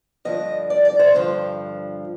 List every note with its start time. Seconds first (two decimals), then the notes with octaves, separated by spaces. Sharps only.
0.25 G2 D3 F3 D#5
0.70 D5
0.85 D5
0.99 C5
1.15 G2 D3 F3